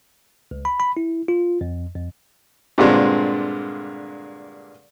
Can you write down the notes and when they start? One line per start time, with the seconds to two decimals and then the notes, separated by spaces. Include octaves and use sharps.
0.51 C#2
0.65 B5
0.80 B5
0.97 E4
1.28 F4
1.61 F2
1.95 F2
2.78 G2 A#2 D3 G#3 C4